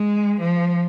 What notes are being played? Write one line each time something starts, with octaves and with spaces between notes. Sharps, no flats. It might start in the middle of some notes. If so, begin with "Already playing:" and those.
Already playing: G#3
F3